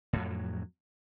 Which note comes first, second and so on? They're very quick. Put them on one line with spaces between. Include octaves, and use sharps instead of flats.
A2 F2 F#3